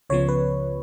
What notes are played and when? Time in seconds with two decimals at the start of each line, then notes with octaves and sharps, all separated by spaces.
0.10 C#2 C#3 F3 B3 C#5
0.29 B4